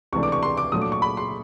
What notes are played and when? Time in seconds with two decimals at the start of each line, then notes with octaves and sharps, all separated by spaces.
0.13 C#2 C3 E3 A3 D4 C#6
0.23 D6
0.32 C#6
0.43 C6
0.57 D6
0.72 A#2 F#3 A3 D4 D#6
0.82 D6
0.92 C#6
1.02 B5
1.17 C6